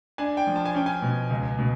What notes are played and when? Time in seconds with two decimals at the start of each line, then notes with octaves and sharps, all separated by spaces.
0.18 D4 G#5
0.37 G5
0.47 F3
0.56 A5
0.65 G#5
0.74 C#4 G5
0.86 G#5
1.02 B2
1.30 C#2
1.59 B2